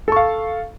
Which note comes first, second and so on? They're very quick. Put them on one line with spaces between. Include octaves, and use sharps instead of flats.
A4 C#6 F5